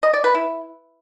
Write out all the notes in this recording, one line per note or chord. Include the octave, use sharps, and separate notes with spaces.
D#5
D5
B4
E4